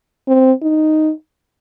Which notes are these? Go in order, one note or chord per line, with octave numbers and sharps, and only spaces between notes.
C4
D#4